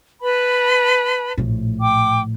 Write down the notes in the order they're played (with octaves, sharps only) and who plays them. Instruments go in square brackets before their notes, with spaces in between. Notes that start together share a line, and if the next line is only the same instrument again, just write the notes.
[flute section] B4 A5 B5
[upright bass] A#1 A2
[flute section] G5 D6